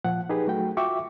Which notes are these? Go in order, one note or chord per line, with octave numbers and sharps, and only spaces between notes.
A#2 F3 F#5
D#4 G4 G#4 B4
F#3 A3 F#4 G5
F4 F#4 E5 G5 C#6 D6